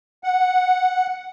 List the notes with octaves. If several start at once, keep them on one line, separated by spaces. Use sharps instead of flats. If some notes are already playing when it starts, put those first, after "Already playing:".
F#5